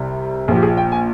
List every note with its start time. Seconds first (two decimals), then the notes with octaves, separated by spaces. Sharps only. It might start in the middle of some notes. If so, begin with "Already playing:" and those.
Already playing: C2 C3 G3
0.48 A#1 A#2 F3 G#4
0.56 G4
0.62 G#4
0.77 G5
0.92 G#5